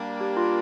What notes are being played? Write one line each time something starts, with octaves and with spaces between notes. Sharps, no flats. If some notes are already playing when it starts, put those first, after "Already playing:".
Already playing: G3 A#3 D4
G4
F4